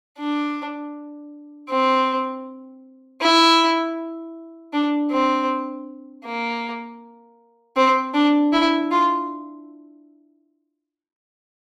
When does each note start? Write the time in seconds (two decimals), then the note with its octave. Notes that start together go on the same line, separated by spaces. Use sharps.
0.18 D4
1.69 C4
3.21 E4
4.73 D4
5.11 C4
6.24 A#3
7.76 C4
8.14 D4
8.53 E4
8.91 F4